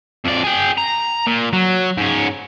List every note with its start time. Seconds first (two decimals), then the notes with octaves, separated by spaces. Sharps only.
0.25 F2 D5
0.44 G#4 G5
0.78 A#5
1.27 A#2
1.53 F#3
1.98 G#2 C#4